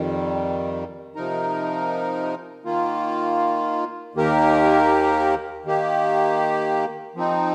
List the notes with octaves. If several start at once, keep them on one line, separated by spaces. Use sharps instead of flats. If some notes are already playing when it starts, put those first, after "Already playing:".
Already playing: F2 D#3 G3
C3 F3 D#4 A#4
D#3 A#3 F4
D#2 D#3 A#3 G4 A#4
D#3 A#3 G4
F3 C4 D#4